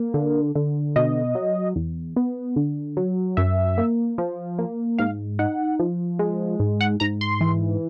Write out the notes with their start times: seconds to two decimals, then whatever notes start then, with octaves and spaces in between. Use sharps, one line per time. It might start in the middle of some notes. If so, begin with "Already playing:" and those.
Already playing: A#3
0.14 D3
0.56 D3
0.96 B2 D#5
1.35 F#3
1.76 E2
2.16 B3
2.56 D3
2.97 F#3
3.37 F#2 E5
3.78 A#3
4.18 F3
4.59 A#3
4.98 G#2 F5
5.39 D#4 F#5
5.80 F3
6.19 G#3
6.60 G#2
6.81 F#5
7.00 G#2 A#5
7.21 C6
7.41 E3